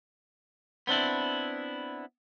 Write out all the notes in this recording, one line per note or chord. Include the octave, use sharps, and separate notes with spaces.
B3 C4 D4 E4